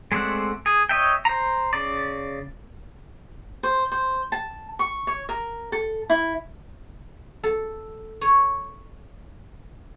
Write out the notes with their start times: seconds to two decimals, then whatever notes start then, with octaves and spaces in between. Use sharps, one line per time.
0.12 G#3 A3 C4 D5 F#5
0.66 G#4
0.89 C#5 D#5 E5 G5
1.25 C5 A#5
1.73 C#3 D5
3.63 C5
3.92 C5
4.32 A5
4.79 C#6
5.07 C#5
5.29 A#4
5.72 A4
6.10 E4
7.43 A4
8.21 C#5